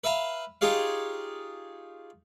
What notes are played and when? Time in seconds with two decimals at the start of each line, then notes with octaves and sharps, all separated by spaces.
0.04 B4 E5 F5 A#5
0.61 D#4 F4 G4 G#4 C#5 F5